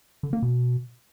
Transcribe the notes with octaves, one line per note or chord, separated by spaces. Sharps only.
D3
A#3
B2